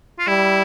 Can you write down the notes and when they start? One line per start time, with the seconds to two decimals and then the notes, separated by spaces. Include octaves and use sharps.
0.19 F4
0.27 G3 E4